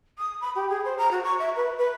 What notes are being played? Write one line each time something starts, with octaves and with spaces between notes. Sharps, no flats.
D#6
B5
G4
G#4
C5
A#5
F#4
C#6
E5
B4
B4